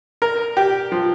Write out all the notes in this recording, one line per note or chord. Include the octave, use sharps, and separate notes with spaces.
A#4
G4
F3